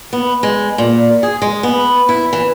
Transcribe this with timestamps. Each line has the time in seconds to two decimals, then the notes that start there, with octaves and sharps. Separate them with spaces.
0.13 B3
0.43 G#3
0.78 A#2
1.23 G#4
1.42 G#3
1.63 B3
2.09 E4
2.33 E3